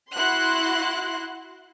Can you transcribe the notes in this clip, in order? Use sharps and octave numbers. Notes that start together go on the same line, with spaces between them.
E4 F#4 F#5 C6 F#6